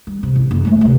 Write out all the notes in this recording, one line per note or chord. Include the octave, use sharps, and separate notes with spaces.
G3
C3
A1
F#1
G#3 A3
D2 C3